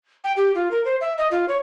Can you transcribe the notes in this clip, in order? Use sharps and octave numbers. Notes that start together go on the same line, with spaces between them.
G5
G4
F4
A#4
C5
E5
D#5
F4
C#5